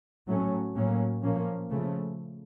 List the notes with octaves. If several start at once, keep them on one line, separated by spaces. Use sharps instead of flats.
A2 F#3 A3 C#4
A2 F#3 A#3 C#4
A#2 F3 A#3 C#4
C#3 F3 A3